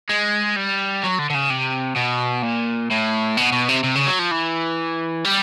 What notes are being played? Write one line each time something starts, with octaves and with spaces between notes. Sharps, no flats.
G#3
G3
F#3
D3
D3
C#3
C3
B2
A#2
A2
B2
B2
C3
C3
C#3
F#3
F3
E3
G3